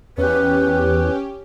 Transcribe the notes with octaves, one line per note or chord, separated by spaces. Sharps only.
E2 C#4 G4 B4